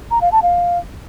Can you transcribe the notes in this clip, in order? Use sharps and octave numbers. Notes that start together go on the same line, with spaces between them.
A#5
F5
A5
F5